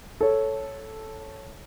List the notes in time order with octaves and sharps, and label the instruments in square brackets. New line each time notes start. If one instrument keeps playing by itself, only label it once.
[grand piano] A4 C#5